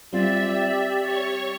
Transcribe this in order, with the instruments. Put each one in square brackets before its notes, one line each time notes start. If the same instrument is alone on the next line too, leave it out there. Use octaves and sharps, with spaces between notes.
[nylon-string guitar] G3 C4 F4 [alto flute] G4 [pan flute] D5 [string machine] E5
[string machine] C#5 C#6